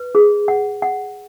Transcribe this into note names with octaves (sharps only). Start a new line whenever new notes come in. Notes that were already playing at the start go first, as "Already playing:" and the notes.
Already playing: B4
G#4
F#5
F#5